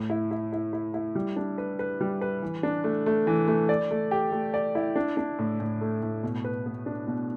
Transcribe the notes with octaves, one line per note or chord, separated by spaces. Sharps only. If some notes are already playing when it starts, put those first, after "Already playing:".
Already playing: A2
E4
E4
E4
E4
E4
G3
D4
B4
B4
G3
B4
E3
D4
A3
A3
E3
A3
D5
A3
G4
A3
D5
E4
D4
D4
A2
A2
A3
A2
B2
B4
B3
D4
B2